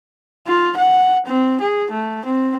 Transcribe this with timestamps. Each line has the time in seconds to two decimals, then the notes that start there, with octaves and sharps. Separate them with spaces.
0.47 F4
0.77 F#5
1.26 C4
1.61 G#4
1.91 A3
2.25 C4